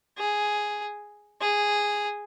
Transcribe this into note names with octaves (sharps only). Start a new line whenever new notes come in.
G#4
G#4